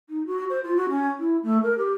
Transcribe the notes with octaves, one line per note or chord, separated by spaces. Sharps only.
D#4
F#4
C5
F4
F#4
C#4
E4
A3
A#4
G4